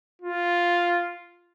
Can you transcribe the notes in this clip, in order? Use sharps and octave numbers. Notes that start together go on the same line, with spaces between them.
F4